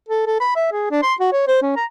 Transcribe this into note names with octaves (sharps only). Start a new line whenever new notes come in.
A4
A4
B5
E5
G#4
D4
C6
F#4
C#5
C5
C#4
A#5